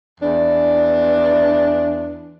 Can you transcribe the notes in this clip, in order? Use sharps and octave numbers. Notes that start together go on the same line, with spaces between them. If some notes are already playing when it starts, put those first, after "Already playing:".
E2 E3 D4